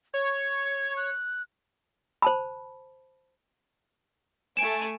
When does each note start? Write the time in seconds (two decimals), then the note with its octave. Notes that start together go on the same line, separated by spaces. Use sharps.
0.14 C#5 G#6
0.97 F#6
2.22 C5 A5 B5
4.57 A3 G#5 D7 E7